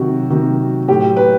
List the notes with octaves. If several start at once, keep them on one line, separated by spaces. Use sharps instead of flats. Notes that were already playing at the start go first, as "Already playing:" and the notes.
Already playing: C3 D#3 F#3 F#4
C3 D#3 F#3
A2 F#3 G4
B4